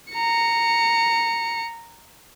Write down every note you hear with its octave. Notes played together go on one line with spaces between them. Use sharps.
A#5 C#7